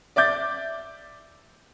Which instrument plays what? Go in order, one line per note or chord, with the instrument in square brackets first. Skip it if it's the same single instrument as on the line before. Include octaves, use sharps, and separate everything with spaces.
[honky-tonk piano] D5 E5 D6 G6 A6